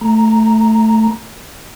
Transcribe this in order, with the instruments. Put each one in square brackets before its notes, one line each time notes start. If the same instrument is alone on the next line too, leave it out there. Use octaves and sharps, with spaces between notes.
[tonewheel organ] A3 A#5